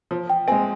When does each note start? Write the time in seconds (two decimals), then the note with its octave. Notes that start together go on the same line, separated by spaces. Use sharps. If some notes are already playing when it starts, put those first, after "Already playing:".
0.11 F3
0.30 G5
0.48 G#3 C4 G#5